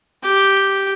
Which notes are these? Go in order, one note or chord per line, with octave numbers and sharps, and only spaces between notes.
G4